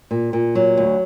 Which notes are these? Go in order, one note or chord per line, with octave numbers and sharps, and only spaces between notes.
A#2
A#2
F#3
D2